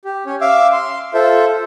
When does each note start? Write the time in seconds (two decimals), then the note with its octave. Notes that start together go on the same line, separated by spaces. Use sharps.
0.05 G4
0.26 C#4 C#5
0.41 E5 F5 D6 E6
0.72 C6
1.14 F4 A4 C5 E5